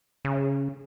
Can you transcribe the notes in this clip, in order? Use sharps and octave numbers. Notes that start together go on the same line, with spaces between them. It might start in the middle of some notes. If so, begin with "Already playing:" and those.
C#3